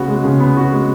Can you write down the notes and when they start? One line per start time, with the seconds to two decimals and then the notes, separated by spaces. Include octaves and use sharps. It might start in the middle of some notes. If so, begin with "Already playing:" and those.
Already playing: C#3 B3 F#4
0.08 G#3
0.24 C#3
0.40 B3
0.57 F#4
0.72 G#3